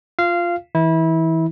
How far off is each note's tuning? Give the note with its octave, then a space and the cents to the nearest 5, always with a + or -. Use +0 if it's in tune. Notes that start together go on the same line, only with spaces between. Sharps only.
F4 +0 F5 -15
E3 -20 E4 -25